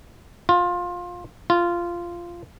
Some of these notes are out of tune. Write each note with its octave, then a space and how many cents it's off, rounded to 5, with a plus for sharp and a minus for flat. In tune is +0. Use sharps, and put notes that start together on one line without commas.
F4 +20
F4 -10